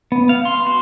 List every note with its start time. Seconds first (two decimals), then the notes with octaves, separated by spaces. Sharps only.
0.12 B3
0.29 F5
0.45 C6
0.67 F#4